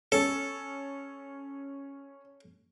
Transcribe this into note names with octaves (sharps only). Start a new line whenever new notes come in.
C#4 A4